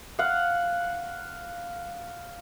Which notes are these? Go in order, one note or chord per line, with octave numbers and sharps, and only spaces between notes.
F5 F#5